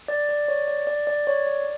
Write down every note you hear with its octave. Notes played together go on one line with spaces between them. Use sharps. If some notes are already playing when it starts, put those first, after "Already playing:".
D5
D5
C#5
D5
D5
D5
C#5
D5